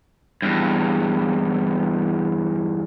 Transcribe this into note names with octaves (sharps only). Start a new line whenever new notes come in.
E2 G2